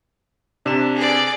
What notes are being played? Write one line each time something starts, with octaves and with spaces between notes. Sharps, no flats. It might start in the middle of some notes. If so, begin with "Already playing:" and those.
C3 D4 E7
G#4 D5